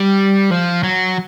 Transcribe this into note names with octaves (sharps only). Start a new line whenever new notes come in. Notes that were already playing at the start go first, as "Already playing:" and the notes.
Already playing: G3
F3
F#3